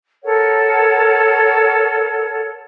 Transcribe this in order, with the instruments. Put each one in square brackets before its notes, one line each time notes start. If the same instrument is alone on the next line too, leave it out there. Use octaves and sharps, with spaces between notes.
[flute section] A4 A#4 C#5 F#5